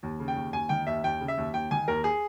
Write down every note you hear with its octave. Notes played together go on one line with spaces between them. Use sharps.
D#2
C#3
G5
D#2
D#2 G#5
D#3 G5
D#2 E5
D#2 G5
C#3
E5
D#2
D#2 G5
D#3 G#5
D#2 A#4
G#4